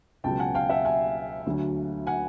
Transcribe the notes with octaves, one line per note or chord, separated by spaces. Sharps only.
C#2 B2 F#3 G5 A5
F#5 G#5
F5 G5
E5 F#5
F#5 G#5
D2 D3 F#3
F#5 G#5